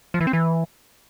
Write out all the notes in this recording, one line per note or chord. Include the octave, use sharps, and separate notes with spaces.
F3
E3
C4
E3